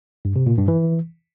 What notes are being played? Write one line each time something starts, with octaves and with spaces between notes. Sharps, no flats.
G2
C3
A#2
G2
E3